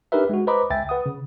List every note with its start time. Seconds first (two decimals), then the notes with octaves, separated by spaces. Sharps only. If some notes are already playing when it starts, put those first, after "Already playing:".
0.12 D4 D#4 G4 A#4 B4 E5
0.29 G#3 F#4
0.47 B4 C5 D#5 A#5 B5 D6
0.70 C#2 E5 G5 G#5 A6
0.89 B4 F#5 D#6
1.06 C#3